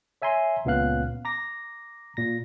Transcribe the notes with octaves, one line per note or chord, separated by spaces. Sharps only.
C#5 E5 G#5 A#5 C6
C#2 A#2 B3 C#4 F5 F#6
A#5 D6 A#6
A#2 A#6